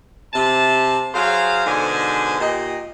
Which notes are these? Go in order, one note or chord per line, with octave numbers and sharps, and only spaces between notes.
C3 A5
F#3 G#4 C5 F5
G#2 B2 D3 C5 G#5
A#2 G4 D#5